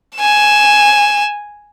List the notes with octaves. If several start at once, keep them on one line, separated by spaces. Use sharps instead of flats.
G#5 E7